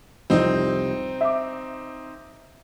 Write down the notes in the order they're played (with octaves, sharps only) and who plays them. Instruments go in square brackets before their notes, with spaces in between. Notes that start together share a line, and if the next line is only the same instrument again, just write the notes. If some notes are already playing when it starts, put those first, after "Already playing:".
[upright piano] C2 F2 C3 [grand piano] C4 D#4
[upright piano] E5 D6